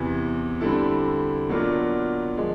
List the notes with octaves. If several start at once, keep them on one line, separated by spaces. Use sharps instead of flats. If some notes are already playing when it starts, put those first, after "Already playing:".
Already playing: E2 C3 E3
D3 G3 C4 E4 A4
B2 F#3 A#3 D4 F4
F3 G#3